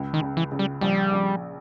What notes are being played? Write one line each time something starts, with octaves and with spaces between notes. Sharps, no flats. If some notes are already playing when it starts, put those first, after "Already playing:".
Already playing: C#2
D#3
C#3
E3
C#3
G3
A#1 G3
A#1